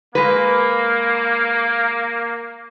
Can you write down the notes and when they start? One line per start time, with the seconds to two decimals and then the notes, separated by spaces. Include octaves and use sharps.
0.15 G#3 A#3 B4